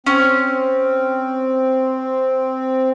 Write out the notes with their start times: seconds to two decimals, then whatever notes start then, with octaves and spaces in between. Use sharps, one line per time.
0.06 C4 C#4